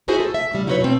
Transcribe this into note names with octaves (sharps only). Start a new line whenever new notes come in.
D#4 E4 F#4 G#4 C5 E5
A4
E5
A2 C#3 G3
F#3 D#4 E4 F#4 B4 C#5
B2 C4